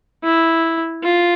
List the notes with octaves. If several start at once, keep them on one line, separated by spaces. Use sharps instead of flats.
E4
F4